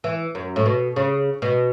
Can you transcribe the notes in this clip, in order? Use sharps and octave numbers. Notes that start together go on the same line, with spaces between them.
E3
F#2
A2
B2
C#3
B2